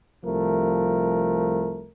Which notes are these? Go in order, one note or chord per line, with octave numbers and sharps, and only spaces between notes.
C2 F3 A3 A#4